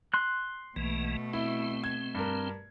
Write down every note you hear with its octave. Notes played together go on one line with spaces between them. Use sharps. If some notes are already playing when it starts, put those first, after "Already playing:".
C6 F#6
B1 B2 E3 A3 A#3
C4 E4
G#6
G2 A#4